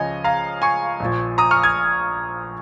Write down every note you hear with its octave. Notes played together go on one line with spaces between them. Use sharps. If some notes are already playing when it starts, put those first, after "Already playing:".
Already playing: C#2 C#3 F3 C#5 D#5 G#5
F5 A#5
G#5 C#6
A#1 A#2 F3
A#5 D#6
C#6 F6
D#6 G#6